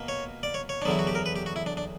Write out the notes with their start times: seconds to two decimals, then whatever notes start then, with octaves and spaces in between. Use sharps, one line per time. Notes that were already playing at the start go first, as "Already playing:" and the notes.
Already playing: B2 A#3
0.08 C#5
0.43 D5
0.54 C#5
0.69 C#5
0.82 D4
0.85 E2 D3 F#3 B3 E4
0.99 F#4
1.07 G4
1.15 A#4
1.26 B4
1.36 G4
1.46 F#4
1.56 E4
1.66 D4
1.77 D4